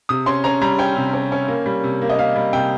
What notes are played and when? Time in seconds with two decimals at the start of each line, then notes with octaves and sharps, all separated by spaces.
0.09 C3 D#6
0.26 C#4 C6
0.44 C#4 A#5
0.62 G3 A#5
0.78 C#4 G5
0.96 C3
1.13 C#4
1.32 C#4
1.48 A#3
1.66 G3
1.84 C3
2.02 A#3
2.10 D#5
2.18 A#3 F5
2.36 G3
2.53 C3 G5